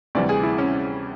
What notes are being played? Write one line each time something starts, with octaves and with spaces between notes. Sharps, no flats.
D2 C3 E3 G3 D5
G#4
E4
C#4